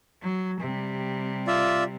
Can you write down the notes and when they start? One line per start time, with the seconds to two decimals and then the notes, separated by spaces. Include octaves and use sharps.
0.22 F#3
0.60 C3 G3
1.47 F4 D5 E5